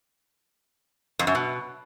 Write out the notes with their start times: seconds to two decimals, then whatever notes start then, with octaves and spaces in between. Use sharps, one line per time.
1.19 F2
1.27 F#2
1.35 B2